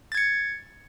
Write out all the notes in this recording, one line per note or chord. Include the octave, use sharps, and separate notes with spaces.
G#6 A6 C#7